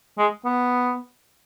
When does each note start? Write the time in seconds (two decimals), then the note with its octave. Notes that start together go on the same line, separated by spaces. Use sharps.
0.18 G#3
0.45 B3